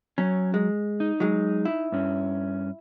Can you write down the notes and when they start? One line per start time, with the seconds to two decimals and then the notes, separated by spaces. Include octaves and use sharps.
0.18 F#3 C#4
0.54 G#3
1.00 D#4
1.20 F#3 G#3
1.65 E4
1.92 G2 C#4